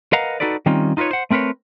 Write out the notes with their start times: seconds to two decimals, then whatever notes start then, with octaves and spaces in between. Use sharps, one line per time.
0.13 A#4 B4 D#5 F5 F#5 A#5
0.40 D#4 F#4 A4 B4 D5
0.66 D#3 G3 C4 C#4 D#4 F4
0.97 D#4 F4 A#4 B4 C#5
1.11 C5 F#5
1.30 A3 C4 A#4 B4 C#5